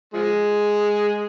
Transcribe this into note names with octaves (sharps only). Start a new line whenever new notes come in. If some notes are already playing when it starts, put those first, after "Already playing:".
F3 G#3